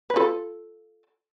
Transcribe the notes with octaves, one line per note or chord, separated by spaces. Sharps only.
B4
F4 A4